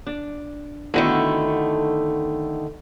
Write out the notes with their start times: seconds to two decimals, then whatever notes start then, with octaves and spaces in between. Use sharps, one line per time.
0.07 D4
0.94 D3 D#3 A3 B3 E4 F#4